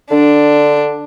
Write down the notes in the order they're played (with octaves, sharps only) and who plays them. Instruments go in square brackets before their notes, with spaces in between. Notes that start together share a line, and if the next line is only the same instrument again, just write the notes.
[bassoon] D3 [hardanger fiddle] D4